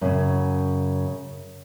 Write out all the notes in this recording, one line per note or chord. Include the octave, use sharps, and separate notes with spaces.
F#2 C#3